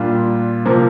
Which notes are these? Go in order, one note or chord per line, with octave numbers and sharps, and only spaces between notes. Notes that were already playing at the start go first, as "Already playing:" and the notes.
Already playing: A#2 G3 D4 F4
C3 F3 A#3